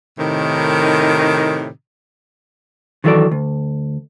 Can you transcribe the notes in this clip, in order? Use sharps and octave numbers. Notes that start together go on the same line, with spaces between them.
A2 C3 D#3
D#3 E3 F#3 E4 A4 D5
D2